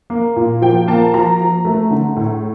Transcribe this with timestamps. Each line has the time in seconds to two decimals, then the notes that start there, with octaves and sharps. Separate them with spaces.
0.10 A#3
0.36 A#2
0.61 F3 G5
0.88 A#3 A5
1.14 F3 A#5
1.40 F3
1.65 A3
1.91 D3
2.16 A2